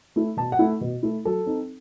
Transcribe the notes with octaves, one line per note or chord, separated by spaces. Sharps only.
A3 E4
B2 A5
F#5
A3 E4
B2
A3 E4
F#3 A4
C4 D#4